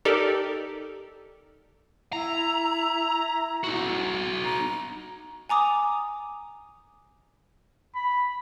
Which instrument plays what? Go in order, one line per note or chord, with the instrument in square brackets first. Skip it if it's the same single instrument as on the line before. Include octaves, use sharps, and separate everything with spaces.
[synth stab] D#4 G4 A4 A#4 D5
[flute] E4 [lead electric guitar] A#5
[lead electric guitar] D#4 F#4
[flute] A#5
[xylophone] G#5 A#5 D6 D#6
[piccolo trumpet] B5